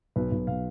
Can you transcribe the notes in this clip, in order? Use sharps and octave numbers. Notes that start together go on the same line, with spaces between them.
B1 B4
B1
B2 F5